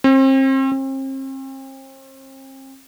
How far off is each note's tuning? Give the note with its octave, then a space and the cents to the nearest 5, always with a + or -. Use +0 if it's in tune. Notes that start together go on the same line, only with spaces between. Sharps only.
C4 +35
C4 +40